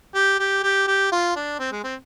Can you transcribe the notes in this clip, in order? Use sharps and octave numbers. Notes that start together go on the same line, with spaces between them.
G4
G4
G4
G4
F4
D4
C4
G#3
C4